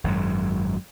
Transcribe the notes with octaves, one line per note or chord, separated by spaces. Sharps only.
G#1 F#2 F#3 G#3